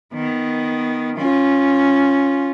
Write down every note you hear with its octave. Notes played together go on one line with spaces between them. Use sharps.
D#3 B3
C#4 F4